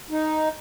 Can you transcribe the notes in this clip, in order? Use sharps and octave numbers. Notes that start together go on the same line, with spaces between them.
D#4